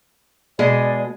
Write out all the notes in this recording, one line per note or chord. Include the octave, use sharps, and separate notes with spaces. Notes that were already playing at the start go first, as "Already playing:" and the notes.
B2 G#3 G#4 D5